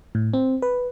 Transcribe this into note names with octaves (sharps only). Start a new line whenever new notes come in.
A2
C4
B4